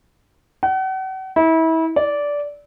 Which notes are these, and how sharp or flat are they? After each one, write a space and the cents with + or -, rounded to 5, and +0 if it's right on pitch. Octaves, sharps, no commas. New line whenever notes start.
F#5 +40
E4 -30
D5 -15